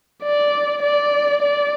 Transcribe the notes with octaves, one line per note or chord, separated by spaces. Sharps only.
D5
D5
D5